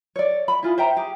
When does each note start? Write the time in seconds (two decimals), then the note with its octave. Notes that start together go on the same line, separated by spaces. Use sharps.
0.16 C#5 D5
0.48 B5
0.63 E4 F4 G#4
0.78 C5 E5 G5 A#5
0.97 G4 G#4